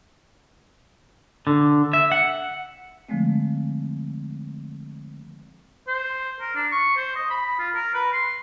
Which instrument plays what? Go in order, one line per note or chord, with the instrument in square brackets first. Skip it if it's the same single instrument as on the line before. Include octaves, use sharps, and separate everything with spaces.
[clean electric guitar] D3
E5
F#5
[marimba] D3 F3 G#3 A3 C4
[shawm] C5
A#4
D4
C#6
C5
D#5
B5
F4
A#4
B4
C6